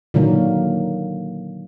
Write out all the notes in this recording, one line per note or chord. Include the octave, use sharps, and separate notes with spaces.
A#2 D3 D#3 F#3 A#3